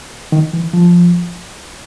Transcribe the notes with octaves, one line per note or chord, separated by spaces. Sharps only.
D#3
E3
F3